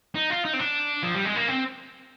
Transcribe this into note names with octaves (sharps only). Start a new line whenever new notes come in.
D#4
F4
D#4
C4
D4
F3
G3
G#3
A#3
C4